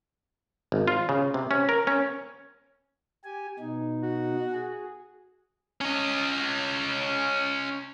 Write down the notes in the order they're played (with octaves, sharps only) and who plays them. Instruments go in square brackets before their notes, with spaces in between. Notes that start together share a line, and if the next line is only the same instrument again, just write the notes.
[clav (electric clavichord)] G#1
F4
C#3
C3
C#4
A#4
C#4
[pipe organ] G4 G#5
B2 D#4
[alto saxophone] F#4
[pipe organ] G#4
[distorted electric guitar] C#4 D#5